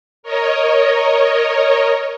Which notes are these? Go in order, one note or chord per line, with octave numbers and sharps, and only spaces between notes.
A#4 C#5 D#5